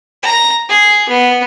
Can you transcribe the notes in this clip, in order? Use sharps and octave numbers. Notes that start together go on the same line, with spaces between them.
A#5
G#4
B3